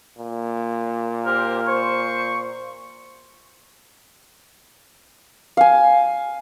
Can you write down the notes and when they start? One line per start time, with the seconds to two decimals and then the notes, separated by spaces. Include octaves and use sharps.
0.18 A#2
1.25 G4 A#4 C5
1.67 C5 C#6
5.57 F5 G#5